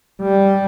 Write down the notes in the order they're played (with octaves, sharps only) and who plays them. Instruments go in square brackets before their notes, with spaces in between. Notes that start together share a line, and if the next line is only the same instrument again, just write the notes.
[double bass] G3